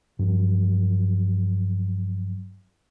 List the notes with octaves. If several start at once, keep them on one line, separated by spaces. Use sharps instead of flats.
G2 F3 F#3